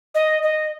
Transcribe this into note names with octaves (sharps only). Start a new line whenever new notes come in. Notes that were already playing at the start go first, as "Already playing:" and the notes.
D#5
D#5